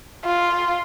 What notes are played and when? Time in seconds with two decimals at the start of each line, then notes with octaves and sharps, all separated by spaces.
0.25 F4